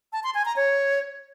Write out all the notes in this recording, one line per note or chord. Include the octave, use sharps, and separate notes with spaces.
A5
C6
G#5
A#5
C#5